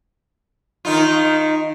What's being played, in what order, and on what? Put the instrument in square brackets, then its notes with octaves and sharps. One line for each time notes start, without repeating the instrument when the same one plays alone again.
[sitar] D#3 D#4 F4